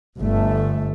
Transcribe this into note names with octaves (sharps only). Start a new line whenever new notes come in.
G1 A3